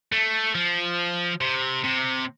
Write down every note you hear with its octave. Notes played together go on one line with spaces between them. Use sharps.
A3
F3
C3
C3